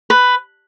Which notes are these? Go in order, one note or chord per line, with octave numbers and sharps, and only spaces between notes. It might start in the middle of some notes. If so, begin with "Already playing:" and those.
B4